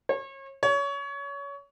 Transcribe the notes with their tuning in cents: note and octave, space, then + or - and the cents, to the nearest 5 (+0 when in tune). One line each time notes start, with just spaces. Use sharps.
C#5 -35
C#5 +25